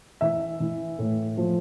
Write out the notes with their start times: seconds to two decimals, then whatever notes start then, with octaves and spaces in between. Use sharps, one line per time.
0.21 E3 E5
0.60 E3
0.99 A2
1.37 F3